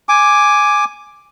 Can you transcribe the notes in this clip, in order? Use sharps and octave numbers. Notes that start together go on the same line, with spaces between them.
G#5 D6